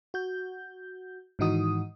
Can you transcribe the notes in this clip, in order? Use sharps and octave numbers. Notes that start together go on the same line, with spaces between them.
F#4 G6
G#2 D#3 E3 D#4 F#4 D#6